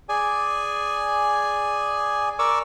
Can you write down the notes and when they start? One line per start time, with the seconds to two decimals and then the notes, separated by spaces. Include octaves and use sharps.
0.09 G#4 D5 G#5
2.39 A#4 D5 C#6 D6 E6